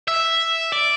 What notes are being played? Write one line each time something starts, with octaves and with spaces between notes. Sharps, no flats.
E5
D5